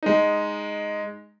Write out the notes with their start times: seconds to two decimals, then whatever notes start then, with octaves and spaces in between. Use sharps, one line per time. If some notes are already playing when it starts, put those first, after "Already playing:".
0.03 G#3 D#4